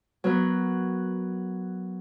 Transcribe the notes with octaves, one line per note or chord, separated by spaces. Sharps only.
F#3 B3 A#4